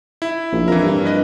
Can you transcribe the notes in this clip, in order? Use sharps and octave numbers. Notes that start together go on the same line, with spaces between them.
E4
A#1
F2 E3 A#4
G2
B4 D#5